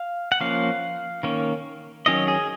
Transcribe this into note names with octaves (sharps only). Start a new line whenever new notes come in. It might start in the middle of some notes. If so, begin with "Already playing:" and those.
Already playing: F5
F#5
F3 A#3 C#4 F5
D#3 A#3 C#4
D#3 F#3 C#4 D#5
G#4